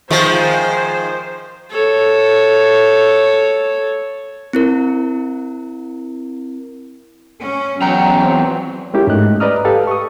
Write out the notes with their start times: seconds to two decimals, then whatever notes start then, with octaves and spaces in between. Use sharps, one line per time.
0.10 D#3 F3 G#3 C5
1.70 A4 C#5
4.53 C4 E4 A#4
7.40 C#4
7.82 E2 F#3 G5 A#5
8.22 C4
8.94 G#3 C#4 E4 F#4 G4 A#4
9.07 G#2 A3 D#5 F#6
9.40 B4 D5 D#5 A#5 D#6 F6
9.65 G4 A4 B4 F5
9.87 C#6 D#6